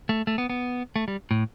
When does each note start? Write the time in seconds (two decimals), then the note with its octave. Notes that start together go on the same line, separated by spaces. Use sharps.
0.09 A3
0.27 A3
0.38 B3
0.50 B3
0.96 A3
1.08 G3
1.31 A2